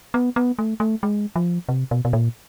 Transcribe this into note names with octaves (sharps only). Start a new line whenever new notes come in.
B3
B3
A3
A3
G#3
F3
C3
B2
B2
A#2